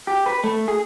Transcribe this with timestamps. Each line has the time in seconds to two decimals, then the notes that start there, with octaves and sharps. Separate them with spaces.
0.07 G4
0.26 B4
0.44 A3
0.68 G#4